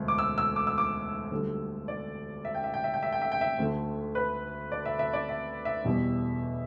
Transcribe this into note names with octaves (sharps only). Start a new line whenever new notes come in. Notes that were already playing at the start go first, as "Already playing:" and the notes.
Already playing: E1 D2 D3
D6
E6
E6
D6
E6
D6
D2 D3 G3
D5
E5
G5
E5
G5
E5
G5
E5
G5
E5
G5
E5
D2 D3 A3
B4
D5
E5
E5
D5
E5
E5
E2 B2 G3